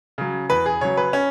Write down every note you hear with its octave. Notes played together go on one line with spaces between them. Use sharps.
C#3 F#3
E2 B4
G#4
C#3 F#3 C#5
B4
C#4